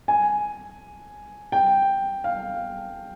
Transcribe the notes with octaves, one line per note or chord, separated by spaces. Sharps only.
G#5
G5
F5